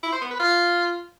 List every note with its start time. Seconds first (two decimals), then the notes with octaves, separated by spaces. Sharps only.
0.03 E4
0.12 C5
0.21 B3
0.31 B4
0.40 F4